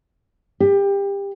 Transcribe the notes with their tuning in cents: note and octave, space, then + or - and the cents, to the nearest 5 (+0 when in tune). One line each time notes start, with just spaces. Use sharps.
G4 +25